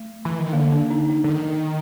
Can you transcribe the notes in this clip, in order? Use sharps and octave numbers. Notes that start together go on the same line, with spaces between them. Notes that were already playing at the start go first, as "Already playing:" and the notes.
Already playing: A3
E3
D#3
D3 A#3
D4
D#4
D#4
D3
D#3